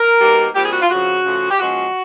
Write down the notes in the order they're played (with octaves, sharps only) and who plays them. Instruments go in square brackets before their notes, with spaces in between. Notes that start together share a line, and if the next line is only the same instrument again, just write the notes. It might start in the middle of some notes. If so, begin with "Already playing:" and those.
Already playing: [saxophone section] A#4
B2 G3 A#3 D#4
A#2 G3 C4 G4
G#4
F#4
F4
F2 C#3 F3 F#4
C#3 F3 A3
G4
A#2 F3 G#3 C#4 F#4